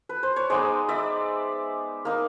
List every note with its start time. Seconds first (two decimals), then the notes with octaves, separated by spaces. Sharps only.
0.09 B4
0.23 C5
0.36 C#5
0.50 G#3 B3 D#4 C5 D5
0.89 D5 E5
2.05 A#3 D#4